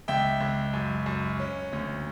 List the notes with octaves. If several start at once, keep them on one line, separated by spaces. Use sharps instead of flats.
C#2 E5 G5
C#2
F#2
F#2
C#4
D2